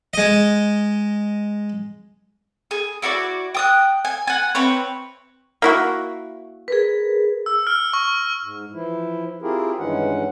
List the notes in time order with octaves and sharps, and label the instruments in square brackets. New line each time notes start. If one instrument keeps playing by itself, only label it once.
[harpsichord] G#3 D#5
[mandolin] G#4
E4 F#4 A4 D5
G5 D#6 F#6
G#5
F#5 G#5
C4 E4 B4 C#5
[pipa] A#3 E4 F#4
[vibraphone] G#4 A#4 B4
[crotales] E6
F6
C#6
[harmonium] G#2
E3 F3 E4
C4 E4 F4 G4 G#4 A#4
G2 D#3 E3 G#3 C#4 F#5